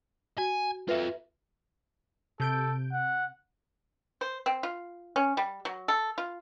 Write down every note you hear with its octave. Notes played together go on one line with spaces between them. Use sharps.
F#4 G#5
F4 A4 B4 E5
C3 A4 G6 D7
F#5
C5
C4
F4
C#4
G3
F#3
A4
F4